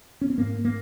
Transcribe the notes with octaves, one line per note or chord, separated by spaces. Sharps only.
C#4
C4
G#2 A#3
A#3